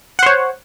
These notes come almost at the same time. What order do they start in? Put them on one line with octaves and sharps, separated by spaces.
F#5 C5 C#5